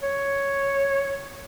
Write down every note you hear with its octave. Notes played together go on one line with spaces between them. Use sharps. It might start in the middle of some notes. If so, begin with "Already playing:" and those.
C#5